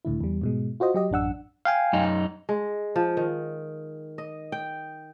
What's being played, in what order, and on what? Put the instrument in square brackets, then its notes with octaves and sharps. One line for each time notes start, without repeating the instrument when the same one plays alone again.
[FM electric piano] C#2 A2 D3 E4
E2 G3
G#2 B2 G#3
F4 F#4 C5 D#5
F#3 G4 D#5
A1 F#2 D4 F#5 E6
[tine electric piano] F5 G5 G#5
[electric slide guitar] F#2 D#4
[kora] G#3
F3
D#3
D#5
G5